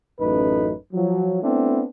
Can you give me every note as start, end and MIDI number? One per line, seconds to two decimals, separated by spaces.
0.21 0.72 33
0.21 0.72 42
0.21 0.72 57
0.21 0.72 63
0.21 0.72 71
0.94 1.41 53
0.94 1.41 54
1.43 1.82 57
1.43 1.82 59
1.43 1.82 60
1.43 1.82 62
1.43 1.82 64